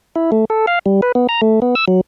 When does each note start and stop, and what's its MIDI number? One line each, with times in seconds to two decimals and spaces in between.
0.16 0.31 64
0.32 0.45 57
0.50 0.66 69
0.67 0.79 77
0.86 1.01 55
1.02 1.12 71
1.15 1.27 59
1.29 1.41 82
1.42 1.60 57
1.62 1.75 59
1.75 1.85 88
1.88 2.01 54